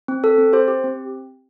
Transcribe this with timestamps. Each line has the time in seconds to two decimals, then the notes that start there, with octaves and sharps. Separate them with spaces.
0.08 C4
0.24 A4
0.38 C4
0.53 G4 C5
0.68 G4
0.84 C4